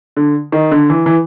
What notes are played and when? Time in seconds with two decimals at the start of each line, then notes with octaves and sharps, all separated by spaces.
0.17 D3
0.52 D#3
0.71 D3
0.90 E3
1.06 E3